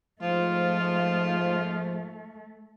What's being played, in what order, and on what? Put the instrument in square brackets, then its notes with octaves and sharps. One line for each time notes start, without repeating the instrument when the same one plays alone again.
[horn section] G#2 F3 [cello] A3 [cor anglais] F4